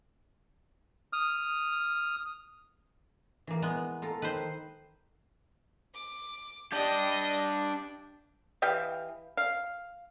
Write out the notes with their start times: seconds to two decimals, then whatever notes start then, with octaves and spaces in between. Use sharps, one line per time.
1.13 D#6 F6
3.47 E3 A#3
3.62 G#3 B3
4.02 F4 A4 A#4
4.22 D#3 B4 C5
5.94 D6
6.72 D4 G4 D#5 G5
8.62 E3 G4 D#5 F5
9.37 F5